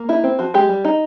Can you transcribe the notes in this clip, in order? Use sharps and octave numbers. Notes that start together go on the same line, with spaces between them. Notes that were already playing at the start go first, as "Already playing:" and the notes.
Already playing: A#3
D#4 E4
C4
F3 F#4
G#3 G4
G3
D#4